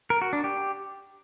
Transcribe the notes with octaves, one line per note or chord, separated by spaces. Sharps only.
A#4
F#4
D4
G4